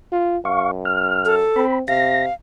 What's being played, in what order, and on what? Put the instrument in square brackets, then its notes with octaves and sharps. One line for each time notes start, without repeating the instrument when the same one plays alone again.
[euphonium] F4
[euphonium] F#2 [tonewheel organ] F5 C#6
[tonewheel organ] F6
[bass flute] A4
[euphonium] C4 [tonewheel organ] B5
[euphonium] C3 [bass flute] F5 [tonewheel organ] A#6